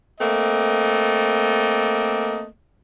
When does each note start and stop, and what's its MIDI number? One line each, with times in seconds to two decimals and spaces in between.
0.20 2.46 57
0.20 2.46 58
0.20 2.46 60
0.20 2.46 75